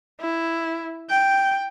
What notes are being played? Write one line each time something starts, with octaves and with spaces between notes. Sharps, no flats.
E4
G5